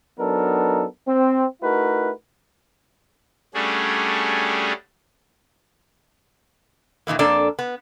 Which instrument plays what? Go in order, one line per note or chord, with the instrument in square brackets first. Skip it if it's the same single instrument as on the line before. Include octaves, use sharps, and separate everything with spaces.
[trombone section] F#3 B3 D4 D#4 A4 A#4
C4
A3 D#4 E4 F#4 A#4 B4
[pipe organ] G3 A3 C#4 D4 F#4 G#4
[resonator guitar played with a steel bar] A#2 D#3 E3 A#3
F2 A#3 D4 A4 D5
B3